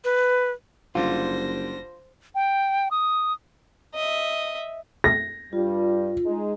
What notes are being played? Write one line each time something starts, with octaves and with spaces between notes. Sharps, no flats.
B4
F#1 D3 G3 F4 C5 A#6
G5
D#6
D#5 E5
A#6
G2 G3 F4
G#3 D#4